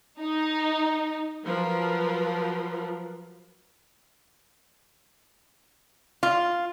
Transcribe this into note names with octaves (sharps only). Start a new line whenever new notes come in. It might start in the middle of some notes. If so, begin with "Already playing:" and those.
D#4
F3 F#3 A#4 B4
F4